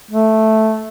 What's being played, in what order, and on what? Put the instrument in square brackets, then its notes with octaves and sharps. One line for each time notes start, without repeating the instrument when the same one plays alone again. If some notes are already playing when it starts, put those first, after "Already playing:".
[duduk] A3